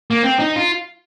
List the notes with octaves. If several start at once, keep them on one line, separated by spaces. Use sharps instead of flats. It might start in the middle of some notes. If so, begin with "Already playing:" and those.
A#3
C4
D#4
F4